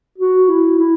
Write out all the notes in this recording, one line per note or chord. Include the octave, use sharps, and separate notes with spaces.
F#4
E4
E4